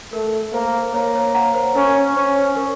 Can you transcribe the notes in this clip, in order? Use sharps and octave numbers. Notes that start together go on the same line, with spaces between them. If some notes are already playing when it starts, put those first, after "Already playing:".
A3 A#4
A#3 C5
A#3 C#5
C#5
F#5 A#5
C5
C#4 A#4
C#4 C5
A#4